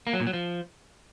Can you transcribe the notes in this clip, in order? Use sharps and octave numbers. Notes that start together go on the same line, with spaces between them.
A#3
F#3
A#2
F#3
F3